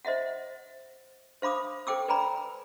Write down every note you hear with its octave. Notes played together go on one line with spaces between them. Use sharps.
C5 D#5 E5 F#5
C5 F5 B5 D6 D#6
A4 C5 G5 D6 E6
B4 D5 G5 G#5 A#5 B5